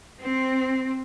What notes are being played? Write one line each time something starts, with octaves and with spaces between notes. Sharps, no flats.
C4